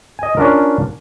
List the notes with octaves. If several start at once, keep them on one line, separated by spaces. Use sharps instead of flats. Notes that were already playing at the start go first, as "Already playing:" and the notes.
D#5 G#5
C#4 D4 F4 A#4